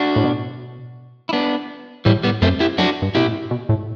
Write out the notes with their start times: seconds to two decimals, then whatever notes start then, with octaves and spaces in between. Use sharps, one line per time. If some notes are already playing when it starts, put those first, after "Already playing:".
Already playing: D4 F#4
0.16 A2
0.24 B2
1.29 E4
1.33 B3 D4
2.05 A2 E3 G3
2.23 G3 B3
2.42 F#2 A3 C4
2.60 E4 G4
2.78 F#2 D4 F#4
3.02 G2
3.15 B2 E4 G4
3.27 A2
3.51 B2
3.69 A2